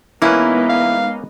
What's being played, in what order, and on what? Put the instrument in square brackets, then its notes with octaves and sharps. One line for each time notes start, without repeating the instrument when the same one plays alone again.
[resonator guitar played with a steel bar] E3 E4 [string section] G#3 B3 D#4 [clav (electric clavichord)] A#3 C#4 B4
[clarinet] F5